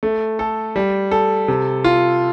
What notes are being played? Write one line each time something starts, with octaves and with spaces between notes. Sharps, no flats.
A3
A4
G3
A4
C3
F4